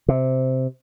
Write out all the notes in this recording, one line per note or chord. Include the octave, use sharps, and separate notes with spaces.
C3